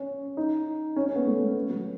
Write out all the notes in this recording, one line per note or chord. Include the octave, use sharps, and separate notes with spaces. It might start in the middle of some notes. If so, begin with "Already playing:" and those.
Already playing: C#4
D#4
C#4
C#4
B3
A3
A3
B3
F#3